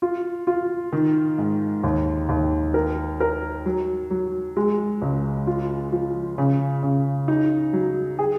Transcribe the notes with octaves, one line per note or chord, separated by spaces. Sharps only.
F4
F4
D#3
G#2
D#2
D#2
A#4
A#4
F#3
F#3
G#3
C#2
F4
F3
C#3
C#3
D#4
F#3
G#4